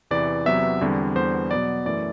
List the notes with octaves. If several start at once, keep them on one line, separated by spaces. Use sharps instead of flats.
E2 C3 E3 D5
E2 C3 F#3 B3 E5
E2 D3 G3 C4
E2 D3 G3 B3 C5
B2 F#3 B3 D5
F#2 E3 A3 D5